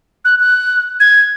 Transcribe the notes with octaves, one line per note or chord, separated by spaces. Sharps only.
F#6
F#6
G#6